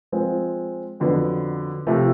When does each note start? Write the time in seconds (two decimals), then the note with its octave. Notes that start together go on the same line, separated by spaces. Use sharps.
0.12 F3 G#3 C4
1.00 F2 D3 F#3 B3
1.87 C3 F3 A3